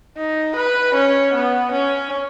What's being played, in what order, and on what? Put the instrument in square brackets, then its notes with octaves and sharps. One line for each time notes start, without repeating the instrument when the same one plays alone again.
[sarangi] D#4
B4
C#4
B3
C#4